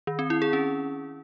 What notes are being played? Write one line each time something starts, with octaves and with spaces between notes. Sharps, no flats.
D#3
C4
E4
G#4
C#4